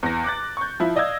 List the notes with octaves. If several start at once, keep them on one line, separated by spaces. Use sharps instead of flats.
E2 A#6
D6 F#6 A6
C#6 G6
F3 E4
D5 D#5 F5 E6 G#6